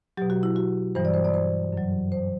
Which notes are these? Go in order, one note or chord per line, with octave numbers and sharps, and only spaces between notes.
B2 F#3 G4
F#4
E4
F#4
G2 E3 G3 C5
D5
C5
D5
C5
F#2 F#3
C5